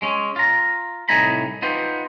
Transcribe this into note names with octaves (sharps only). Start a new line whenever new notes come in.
G#3 C#4
F4 A#5
C2 A2 D#4 G#5 A#5 B5
B3 D#4 F4 G4 B4 C5